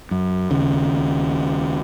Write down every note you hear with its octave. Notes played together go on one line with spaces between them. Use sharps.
F#2
D#2 C#3